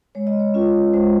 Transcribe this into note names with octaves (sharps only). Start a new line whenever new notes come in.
G#3 C#5
D#5
C#5
C#4 F4
G#3 C5